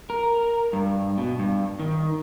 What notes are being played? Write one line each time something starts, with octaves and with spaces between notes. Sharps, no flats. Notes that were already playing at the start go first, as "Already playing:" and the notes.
A#4
G2
B2
G2
D#3